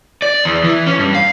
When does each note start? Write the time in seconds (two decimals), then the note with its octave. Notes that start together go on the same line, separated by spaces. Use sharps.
0.22 D5
0.45 E2
0.64 E3
0.86 C#4
0.99 G2
1.15 F5